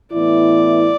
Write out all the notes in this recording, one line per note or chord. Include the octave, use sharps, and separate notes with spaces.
A2 E3 B3 E4 D5